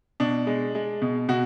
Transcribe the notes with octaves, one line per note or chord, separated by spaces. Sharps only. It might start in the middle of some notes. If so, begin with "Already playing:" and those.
B2 D4
G#3
G#3
B2
B2 F#4